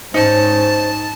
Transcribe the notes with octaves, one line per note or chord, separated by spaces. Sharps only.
G#2 C#4 D#4 C5 A5